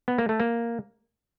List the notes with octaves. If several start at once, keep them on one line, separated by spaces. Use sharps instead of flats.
B3
A#3
A3
A#3